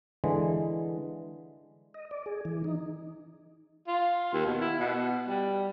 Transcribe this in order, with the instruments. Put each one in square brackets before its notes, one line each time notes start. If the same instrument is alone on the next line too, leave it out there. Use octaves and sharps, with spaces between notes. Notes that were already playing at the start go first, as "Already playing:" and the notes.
[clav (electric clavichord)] D3 E3 G#3
[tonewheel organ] D#5
D5
G#4
E3
D#4
[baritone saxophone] F4
D#2
B2
E4
B2
G3